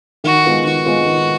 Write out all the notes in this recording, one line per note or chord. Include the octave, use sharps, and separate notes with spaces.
D#3 F#4
G#3 B3 F4
D#3 F#4
G#3 B3 F4
D#3